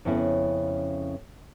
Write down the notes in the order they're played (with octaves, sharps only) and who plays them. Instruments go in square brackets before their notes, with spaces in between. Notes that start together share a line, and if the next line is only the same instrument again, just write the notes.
[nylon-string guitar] F2 C#3 B3 C#4 E4